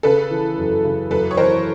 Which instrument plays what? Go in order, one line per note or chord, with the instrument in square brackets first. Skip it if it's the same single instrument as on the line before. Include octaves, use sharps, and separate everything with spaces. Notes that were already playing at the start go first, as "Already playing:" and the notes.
[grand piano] C#3 [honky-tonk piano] A4 B4
[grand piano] E3
F#2
C#3
[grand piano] F#2 [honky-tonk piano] A4 B4
[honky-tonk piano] C#5
[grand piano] E3 [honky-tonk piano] A#4 C5